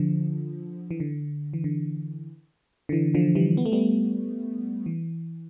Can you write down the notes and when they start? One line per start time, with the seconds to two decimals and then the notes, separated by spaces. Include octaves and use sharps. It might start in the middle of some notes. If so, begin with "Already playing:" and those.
Already playing: D3 F3
0.91 E3
1.00 D3
1.53 E3
1.64 D3
2.89 D3
2.92 E3
3.15 D3 F3
3.35 E3 G3
3.57 B3
3.66 A3
3.72 G3 B3
4.86 E3